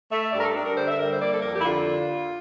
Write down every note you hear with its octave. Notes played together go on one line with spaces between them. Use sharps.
A3 E5
G2 D5
A#4
A4
G2 D4
A#4
D3 C5
E5
G3 A#4
C5
A#3 D5
A4
F2 A#4
G4
E4
D3 F4